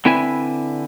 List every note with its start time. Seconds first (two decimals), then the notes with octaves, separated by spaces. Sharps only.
0.05 D3 C4 E4 B4 E5 G#5